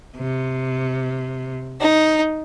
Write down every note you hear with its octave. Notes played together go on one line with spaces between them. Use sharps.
C3
D#4